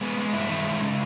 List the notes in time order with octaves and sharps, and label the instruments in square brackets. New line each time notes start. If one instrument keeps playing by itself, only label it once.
[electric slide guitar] G#3 B3
G#3
G2 E4
D#3
G#3
C#3